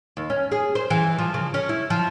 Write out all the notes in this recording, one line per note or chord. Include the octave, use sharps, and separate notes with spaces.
D#2
C#4
G#4
C5
E3
F3
C#3
C#4
E4
F3